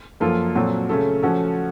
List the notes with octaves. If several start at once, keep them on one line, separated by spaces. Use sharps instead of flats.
F#2 F3 A#3 F4 A4
A#2 F#3 C4 F#4 A4
C#3 A3 C#4 A4
F3 A3 C#4 F#4 A4